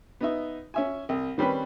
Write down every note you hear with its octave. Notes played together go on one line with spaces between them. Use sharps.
B3 D#4 E5
C#4 E5 G#5
C2
D#3 G3 C4 C#4 B4